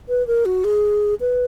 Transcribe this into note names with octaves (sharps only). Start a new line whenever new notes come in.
B4
A#4
F#4
G#4
B4